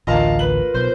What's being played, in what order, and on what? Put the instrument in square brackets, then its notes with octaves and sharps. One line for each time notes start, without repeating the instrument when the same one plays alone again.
[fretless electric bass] A1 D2 [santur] F4 A#4 [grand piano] D#5 F5 A5
[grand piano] B4 F#7
[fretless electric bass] B1 [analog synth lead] C5